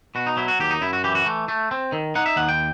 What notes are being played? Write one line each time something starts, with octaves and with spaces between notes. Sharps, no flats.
B2 F#4
D#4
F#3 E4
F#4
D#2 G4
D#4
F#2 E4
F#4
E3 G4
F#4
A3
A3
C4
D#3
D#4 F#5
E5
D#2 F#5
G5